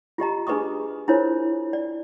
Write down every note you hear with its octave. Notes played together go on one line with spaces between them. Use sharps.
F4 G4 D#5 A#5
D4 G#4 B4 D#5 C#6 D#6
D4 E4 F4 A#4 C5 C#5
D5